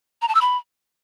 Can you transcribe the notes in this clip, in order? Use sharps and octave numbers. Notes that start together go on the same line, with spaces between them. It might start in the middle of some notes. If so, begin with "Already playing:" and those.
A#5
A5
E6
B5